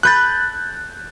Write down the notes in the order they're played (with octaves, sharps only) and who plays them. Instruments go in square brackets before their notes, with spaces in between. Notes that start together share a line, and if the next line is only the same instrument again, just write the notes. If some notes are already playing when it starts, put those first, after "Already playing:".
[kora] A4 B4 [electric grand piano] F#6 G6 A6